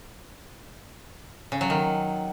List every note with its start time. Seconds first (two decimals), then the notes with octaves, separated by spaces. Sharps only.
1.52 C#3
1.61 F#3
1.70 D#3